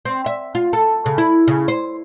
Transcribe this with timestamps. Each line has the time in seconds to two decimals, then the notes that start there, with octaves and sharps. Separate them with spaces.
0.05 C4
0.26 E5
0.55 F4
0.73 A4
1.06 C#3
1.18 E4
1.48 C#3
1.68 C5